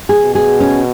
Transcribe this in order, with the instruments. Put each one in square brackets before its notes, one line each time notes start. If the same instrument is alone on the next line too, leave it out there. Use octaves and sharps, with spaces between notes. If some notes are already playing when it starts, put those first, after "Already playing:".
[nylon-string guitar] G#4
[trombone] B2
[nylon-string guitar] G#4
C#4